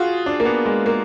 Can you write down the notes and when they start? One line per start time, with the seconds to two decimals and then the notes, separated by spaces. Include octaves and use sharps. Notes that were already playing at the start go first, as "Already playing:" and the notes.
Already playing: F4 F#4 G#4
0.26 D4
0.40 A#3
0.45 B3
0.66 G#3
0.86 A#3